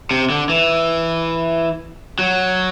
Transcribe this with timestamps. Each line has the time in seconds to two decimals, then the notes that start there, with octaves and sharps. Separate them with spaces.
0.11 C3
0.30 D3
0.49 E3
2.19 F#3